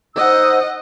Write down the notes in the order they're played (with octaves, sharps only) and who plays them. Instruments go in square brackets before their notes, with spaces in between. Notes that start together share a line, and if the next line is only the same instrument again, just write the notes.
[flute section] D#4 C5 E6 [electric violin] D#5 F#5